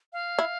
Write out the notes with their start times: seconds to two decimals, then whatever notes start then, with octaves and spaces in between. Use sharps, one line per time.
0.13 F5
0.39 E4